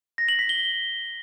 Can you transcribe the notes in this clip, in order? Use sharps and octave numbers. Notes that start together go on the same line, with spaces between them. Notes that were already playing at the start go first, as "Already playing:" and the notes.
A#6
F#7
B6
G7